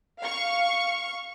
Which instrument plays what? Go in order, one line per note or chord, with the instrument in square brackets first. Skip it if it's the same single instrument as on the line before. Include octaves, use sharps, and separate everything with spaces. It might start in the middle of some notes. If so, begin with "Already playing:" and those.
[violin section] F5 C#6